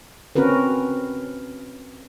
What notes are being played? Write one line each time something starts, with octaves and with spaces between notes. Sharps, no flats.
C4 C#4 F#4 A#4 B4